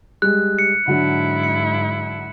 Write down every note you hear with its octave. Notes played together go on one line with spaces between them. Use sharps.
G3 G#3 F#6
C#7
G#2 D3 F#3 D4 E4
C#7